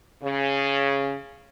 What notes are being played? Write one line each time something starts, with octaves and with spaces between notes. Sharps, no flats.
C#3